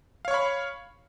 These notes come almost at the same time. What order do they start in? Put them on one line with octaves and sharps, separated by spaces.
F5 C#5 C#6 B5